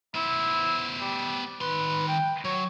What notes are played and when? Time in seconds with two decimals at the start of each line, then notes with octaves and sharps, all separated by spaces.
0.15 B3 E4 C5
1.00 G3
1.61 D#3 B4 C6
2.08 G5
2.45 F#3 C#5